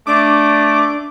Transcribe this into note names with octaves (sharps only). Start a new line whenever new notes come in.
A3 D4 D6